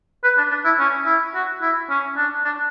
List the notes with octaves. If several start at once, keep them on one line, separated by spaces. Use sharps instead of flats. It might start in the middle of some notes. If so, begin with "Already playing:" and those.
B4
D4
D4
E4
C#4
E4
F#4
E4
C#4
D4
D4